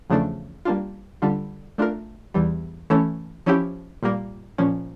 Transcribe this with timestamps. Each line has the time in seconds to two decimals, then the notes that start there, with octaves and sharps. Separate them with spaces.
0.10 E2 C#3 F3 A3 D4
0.65 G3 A#3 D4 F4
1.22 D3 G3 D4 F4
1.78 A3 D4 F4 A#4
2.34 E2 E3 G3
2.90 E3 A3 C#4 E4
3.46 F3 C#4 E4 G4
4.03 A#2 G3 A#3
4.58 A#2 F3 C#4